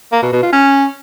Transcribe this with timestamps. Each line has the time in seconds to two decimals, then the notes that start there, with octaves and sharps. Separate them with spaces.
0.12 A#3
0.22 B2
0.32 B2
0.43 F4
0.53 C#4